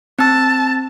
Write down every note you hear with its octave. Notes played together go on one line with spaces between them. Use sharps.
C4 A5 E6